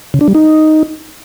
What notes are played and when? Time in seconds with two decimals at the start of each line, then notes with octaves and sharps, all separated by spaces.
0.14 C#3
0.21 D4
0.28 G3
0.35 D#4